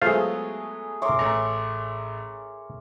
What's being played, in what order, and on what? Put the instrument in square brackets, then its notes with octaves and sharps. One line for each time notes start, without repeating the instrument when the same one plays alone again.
[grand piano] F#3 G#3 B3 [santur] A3 G#4 [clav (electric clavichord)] F4 C5 F5
[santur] A#4 C#5 [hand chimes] E5 C6 D6
[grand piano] A1 A3 [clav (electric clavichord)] A#5